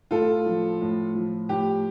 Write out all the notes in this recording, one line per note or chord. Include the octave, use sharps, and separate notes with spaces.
A2 F4 A4
F3
A2
F3
A2 G4